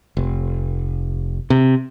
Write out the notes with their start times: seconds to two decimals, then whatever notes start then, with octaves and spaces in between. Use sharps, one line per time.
0.17 F1
1.50 C3